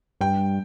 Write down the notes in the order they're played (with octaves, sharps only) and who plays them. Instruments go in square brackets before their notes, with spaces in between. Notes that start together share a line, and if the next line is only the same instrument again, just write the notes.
[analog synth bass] G2 [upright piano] G5